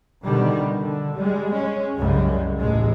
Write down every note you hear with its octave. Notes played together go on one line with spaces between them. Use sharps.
B2 D3 D#3 G3
D3
G3 G#3
G#3 C#4
C2 F#2 C#3 G3 G#3
A1 D#2 A2 G#3